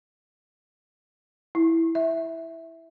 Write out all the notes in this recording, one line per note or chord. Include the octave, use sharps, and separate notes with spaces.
E4
E5